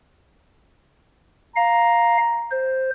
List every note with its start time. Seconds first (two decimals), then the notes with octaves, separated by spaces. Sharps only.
1.56 F5 A#5
2.51 C5